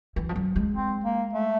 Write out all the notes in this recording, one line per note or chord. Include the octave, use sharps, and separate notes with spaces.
E3
F3
F#3
G#3
C4
A#3
A3